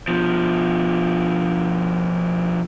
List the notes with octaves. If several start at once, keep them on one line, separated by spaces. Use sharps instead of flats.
B2 F3